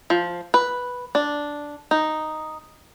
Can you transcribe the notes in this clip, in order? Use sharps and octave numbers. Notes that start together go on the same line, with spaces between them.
F3
B4
D4
D#4